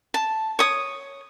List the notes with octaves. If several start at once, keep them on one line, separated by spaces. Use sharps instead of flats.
A5
C#5 D#6